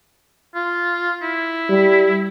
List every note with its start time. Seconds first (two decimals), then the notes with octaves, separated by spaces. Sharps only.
0.55 F4
1.22 E4
1.69 G3